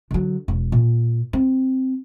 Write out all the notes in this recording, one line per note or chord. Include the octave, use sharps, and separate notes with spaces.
D3 F#3
E1
A#2
C4